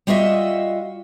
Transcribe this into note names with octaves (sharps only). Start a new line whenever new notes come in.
G3 F4 F#4 D#5 E5